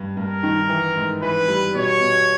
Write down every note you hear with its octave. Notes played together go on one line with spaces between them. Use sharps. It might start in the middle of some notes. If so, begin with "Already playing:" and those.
Already playing: G2
G2 A#4
D#3
E3
G#2
E3 B4
G3
B2 C#5
B2